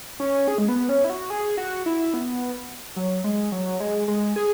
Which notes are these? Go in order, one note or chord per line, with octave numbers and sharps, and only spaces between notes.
C#4
G#4
G#3
B3
C#4
E4
F#4
G#4
F#4
E4
B3
F#3
G#3
F#3
G#3
G#3
G#4